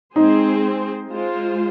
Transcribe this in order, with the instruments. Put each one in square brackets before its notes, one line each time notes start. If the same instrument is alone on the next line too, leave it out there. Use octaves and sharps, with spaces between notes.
[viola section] G#3 C4 G#4 C5 [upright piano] D#4
[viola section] G#3 F4 C5